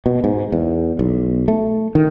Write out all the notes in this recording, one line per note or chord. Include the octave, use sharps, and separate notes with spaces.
B2
G#2
E2
B1
A3
D#3